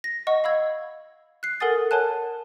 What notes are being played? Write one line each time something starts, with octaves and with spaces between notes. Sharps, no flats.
A#6
D#5 F#5 C#6
F5 B5 E6 G#6
F#6 C7
A4 A#4 F#5 G#5 D#6 A6
A#4 C#5 F#5 G#5 A5 F#6